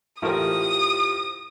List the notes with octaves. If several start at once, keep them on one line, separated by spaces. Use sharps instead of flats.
A1 F4 G4 A#4 C5 D#6